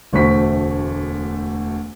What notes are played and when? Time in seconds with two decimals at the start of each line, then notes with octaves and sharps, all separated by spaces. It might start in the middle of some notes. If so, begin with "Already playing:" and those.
0.13 E1 D2 A3 C5 C#6 B6